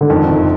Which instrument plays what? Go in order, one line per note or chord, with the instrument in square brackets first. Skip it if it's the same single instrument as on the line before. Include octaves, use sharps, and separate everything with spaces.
[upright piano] D3
[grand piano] F2 [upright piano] D#3
[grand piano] F#1